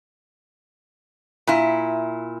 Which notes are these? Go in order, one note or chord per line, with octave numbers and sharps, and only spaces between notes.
A#2 E4